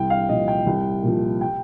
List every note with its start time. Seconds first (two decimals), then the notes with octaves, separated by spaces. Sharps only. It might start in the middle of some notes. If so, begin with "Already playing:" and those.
Already playing: C2 G5
0.10 F5
0.29 A#2 F3 D#5
0.48 G5
0.66 C2
1.03 A#2 F3
1.41 G5